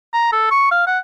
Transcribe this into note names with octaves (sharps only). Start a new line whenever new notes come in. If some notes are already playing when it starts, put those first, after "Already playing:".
A#5
A4
C#6
F5
F#5